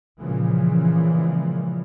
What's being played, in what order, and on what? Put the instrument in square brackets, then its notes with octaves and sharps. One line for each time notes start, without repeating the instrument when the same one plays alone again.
[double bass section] A#2 C#3 E3 F3 G#3